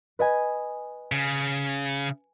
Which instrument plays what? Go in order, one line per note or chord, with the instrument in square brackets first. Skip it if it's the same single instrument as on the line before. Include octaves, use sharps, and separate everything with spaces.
[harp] B4 D#5 G#5
[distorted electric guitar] C#3